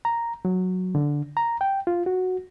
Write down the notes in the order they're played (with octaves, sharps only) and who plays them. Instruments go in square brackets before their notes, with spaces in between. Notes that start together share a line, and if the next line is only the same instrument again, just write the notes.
[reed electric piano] A#5
F#3
D3
A#5
G5
F4
F#4